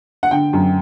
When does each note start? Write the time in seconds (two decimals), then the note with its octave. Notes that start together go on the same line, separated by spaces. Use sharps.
0.23 F#5
0.31 D3 G5
0.53 F#2